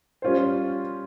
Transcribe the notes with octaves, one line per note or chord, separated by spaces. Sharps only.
G3 C#4 F4 C5